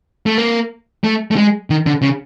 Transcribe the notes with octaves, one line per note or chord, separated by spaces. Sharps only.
A3
A#3
A3
A3
G#3
D#3
D3
C#3